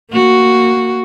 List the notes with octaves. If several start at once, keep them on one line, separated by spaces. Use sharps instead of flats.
A#3 F#4